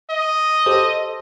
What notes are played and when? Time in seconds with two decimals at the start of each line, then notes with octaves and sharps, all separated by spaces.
0.10 D#5
0.66 G4 A4 C5